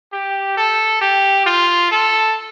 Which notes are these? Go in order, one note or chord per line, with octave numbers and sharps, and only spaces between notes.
G4
A4
G4
F4
A4